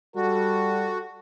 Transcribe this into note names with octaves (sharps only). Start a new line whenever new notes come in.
G3 F#4 A4